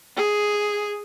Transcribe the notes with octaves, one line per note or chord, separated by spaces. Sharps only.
G#4